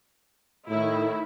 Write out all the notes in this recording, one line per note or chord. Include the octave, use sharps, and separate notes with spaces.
A2 D#3 E4